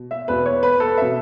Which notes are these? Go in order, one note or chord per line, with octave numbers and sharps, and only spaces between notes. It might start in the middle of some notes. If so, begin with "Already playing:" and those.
Already playing: B2
E5
E2 B2 B4
C#5
B4
A4
B2 E5